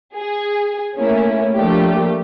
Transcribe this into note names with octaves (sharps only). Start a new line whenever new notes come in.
G#4
A3 A#3 C#4 E4
F3 G3 A3 A#3 D4 G4